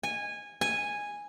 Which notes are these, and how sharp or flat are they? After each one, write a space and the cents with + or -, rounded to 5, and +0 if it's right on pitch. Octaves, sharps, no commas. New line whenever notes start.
G#5 -15
G#5 -10